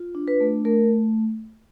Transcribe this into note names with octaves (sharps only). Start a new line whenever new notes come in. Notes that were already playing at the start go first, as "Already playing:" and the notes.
Already playing: F4
D4
B4
A3
A3 A#4